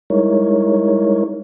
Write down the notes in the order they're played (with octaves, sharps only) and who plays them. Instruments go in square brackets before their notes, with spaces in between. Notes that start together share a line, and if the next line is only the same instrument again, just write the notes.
[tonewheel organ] G3 G#3 D#4 E4 A#4 C#5